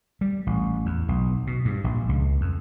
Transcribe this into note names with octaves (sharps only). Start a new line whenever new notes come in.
G3
A1
E2
B1
B2
G2
A#1
C#2
F2